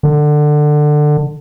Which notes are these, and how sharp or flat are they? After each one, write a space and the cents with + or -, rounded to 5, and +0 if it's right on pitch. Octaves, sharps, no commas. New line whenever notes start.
D3 +20